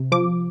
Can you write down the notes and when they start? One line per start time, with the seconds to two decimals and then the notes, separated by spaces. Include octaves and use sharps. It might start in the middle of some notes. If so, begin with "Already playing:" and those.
Already playing: C3
0.12 F3 D6